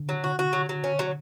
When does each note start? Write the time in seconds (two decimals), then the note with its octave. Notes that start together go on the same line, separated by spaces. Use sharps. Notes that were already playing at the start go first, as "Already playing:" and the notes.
Already playing: D3
0.09 F#3
0.24 F#4
0.39 F#4
0.53 F#3
0.69 F#3
0.84 C#4
0.99 F#3